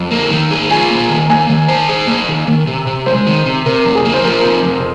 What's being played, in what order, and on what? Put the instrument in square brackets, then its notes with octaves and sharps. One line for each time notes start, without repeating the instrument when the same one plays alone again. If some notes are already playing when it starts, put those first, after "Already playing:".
Already playing: [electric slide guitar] F2
A#3
D#3
G#4
[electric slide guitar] F4 [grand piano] G#5
[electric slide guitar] A#3
D#3
[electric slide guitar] A#3 [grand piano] G#5
[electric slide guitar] D#3
C5
G#4
A#3
D#3
D#3
C3
C3
[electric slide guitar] G#3 [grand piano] C5
[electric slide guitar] D#3
C3
[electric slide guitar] C3 [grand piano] A#4
[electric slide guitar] F2
[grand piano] G#4
[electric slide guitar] A#3
[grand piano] C5
[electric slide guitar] F3 [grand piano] A#4
[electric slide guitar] C3
F2